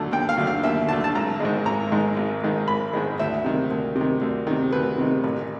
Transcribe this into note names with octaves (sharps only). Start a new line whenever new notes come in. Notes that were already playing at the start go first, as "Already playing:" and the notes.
Already playing: D#2 D3 F#3 A3
D#2 G5
F5
D3 F#3 A3
F5
D#2 E5
D3 F#3 A3 A5
A5
G#1 A#5
G#2 D#3 G#3
G#1 A#5
G#2 D#3 G#3
G#1
G#2 D#3 G#3
G#1 B5
G#2 D#3 G#3
D2 E5
C3 D#3
D2
C3
D#3
D2
C3 D#3
D2 B4
C3 D#3
A1